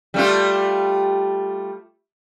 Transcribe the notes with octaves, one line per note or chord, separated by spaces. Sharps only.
G3 A3 F4